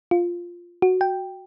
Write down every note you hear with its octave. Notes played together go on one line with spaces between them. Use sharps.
F4
F#4
G5